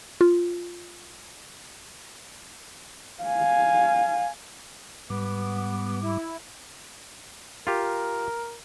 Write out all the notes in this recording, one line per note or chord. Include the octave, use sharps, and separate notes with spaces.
F4
F5 G#5
G#2 G3 B3 D6
E4
F4 G4 A#4